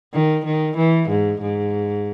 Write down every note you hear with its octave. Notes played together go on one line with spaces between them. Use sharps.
D#3
D#3
E3
G#2
G#2